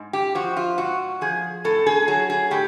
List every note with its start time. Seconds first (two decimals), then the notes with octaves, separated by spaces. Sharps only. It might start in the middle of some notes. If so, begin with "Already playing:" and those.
Already playing: G#2
0.13 G4
0.35 F3 F#4
0.57 F4
0.78 G#2 F#4
1.21 F3 G#4
1.64 A2 A4
1.86 G#4
2.08 F#3 G#4
2.30 G#4
2.51 A2 G4